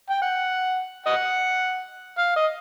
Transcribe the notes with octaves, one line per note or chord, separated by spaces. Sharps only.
G5
F#5
D#5 F#5
F5
D#5